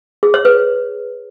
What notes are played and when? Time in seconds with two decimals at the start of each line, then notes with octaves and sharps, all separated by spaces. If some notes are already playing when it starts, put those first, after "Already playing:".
0.23 G#4
0.34 C#5
0.45 B4